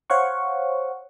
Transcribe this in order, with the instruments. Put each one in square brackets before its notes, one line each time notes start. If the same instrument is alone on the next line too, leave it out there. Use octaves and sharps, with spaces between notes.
[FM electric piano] C5 C#5 F5 F#5 C#6